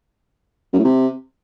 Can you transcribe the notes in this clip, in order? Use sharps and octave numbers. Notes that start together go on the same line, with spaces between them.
F#2
A2
C3